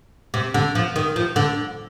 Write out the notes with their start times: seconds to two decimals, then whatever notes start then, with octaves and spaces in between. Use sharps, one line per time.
0.34 C3
0.54 D3
0.75 F3
0.96 D#3
1.16 F3
1.36 D3